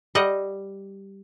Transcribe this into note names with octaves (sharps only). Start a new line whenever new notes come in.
G3 D#5 F#5